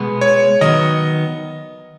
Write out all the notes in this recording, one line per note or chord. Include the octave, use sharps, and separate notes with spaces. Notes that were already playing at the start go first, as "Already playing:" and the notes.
Already playing: B2 G#3 B3
C#5
D#3 F#3 B3 D#5